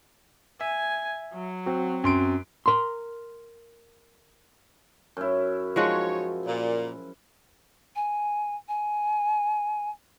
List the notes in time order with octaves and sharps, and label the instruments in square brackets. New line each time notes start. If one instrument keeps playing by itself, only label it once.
[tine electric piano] E5 [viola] G#5
[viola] F#3
[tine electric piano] C4 F#4
[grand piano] F#2 C6 D7
[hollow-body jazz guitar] A#4 C6
[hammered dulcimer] F#2 E4
[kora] F3 G#3 F#4 [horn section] D#4 C#5
[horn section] A#2
[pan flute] G#5
G#5